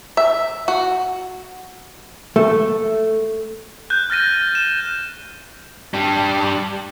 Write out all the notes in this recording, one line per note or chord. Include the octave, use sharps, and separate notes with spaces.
E5
F#4
A3
F#6 G6
F6 A6 A#6 D#7
E7
G3 D4